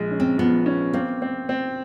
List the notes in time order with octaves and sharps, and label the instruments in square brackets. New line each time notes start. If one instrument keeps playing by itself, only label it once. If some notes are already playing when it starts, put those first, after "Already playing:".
Already playing: [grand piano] A#1 G#3
C#4
[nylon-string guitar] C4
[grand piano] F3 [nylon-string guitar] B3
[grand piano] C#4
[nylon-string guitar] A#3 [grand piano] C4
[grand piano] C4
C4